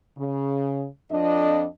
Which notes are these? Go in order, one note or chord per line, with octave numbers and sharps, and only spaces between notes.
C#3
F2 D4 D#5